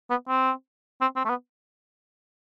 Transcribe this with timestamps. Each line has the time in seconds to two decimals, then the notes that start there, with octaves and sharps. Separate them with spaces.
0.10 B3
0.28 C4
1.01 C4
1.16 C4
1.25 A3
1.29 B3